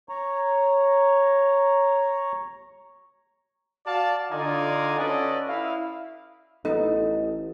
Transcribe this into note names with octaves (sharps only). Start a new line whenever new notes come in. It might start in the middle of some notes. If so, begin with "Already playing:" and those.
C#5 A#5
F#4 D5 F5 A5
D3 D#4 F4 D5 G#5 A#5
C#4 F#4 A4 B4 D5 D#5
E4 F5
A1 B3 D#4 A4 D#5